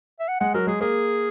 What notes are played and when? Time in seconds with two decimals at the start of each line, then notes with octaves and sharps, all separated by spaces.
0.20 E5
0.28 F#5
0.40 G#3 F#5
0.54 F#3 A#4
0.67 G#3 G#4
0.81 A#3 G#4